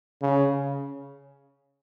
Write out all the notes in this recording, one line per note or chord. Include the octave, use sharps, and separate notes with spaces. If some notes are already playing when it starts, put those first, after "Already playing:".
C#3